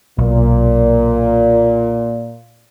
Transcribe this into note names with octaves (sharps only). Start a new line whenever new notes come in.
B1 A#2